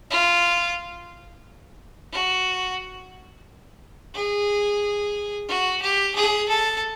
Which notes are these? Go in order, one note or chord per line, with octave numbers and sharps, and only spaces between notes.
F4
F#4
G#4
F#4
G4
G#4
A4